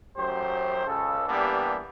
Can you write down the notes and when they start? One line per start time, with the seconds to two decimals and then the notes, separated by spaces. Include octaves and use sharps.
0.17 A1 F#2 F#3 G4 C5
0.87 C#2 C#3 A4
1.28 E3 G3 A#3 B3 D4 G4